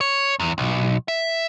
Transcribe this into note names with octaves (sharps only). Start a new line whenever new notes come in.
C#5
E2
B1
E5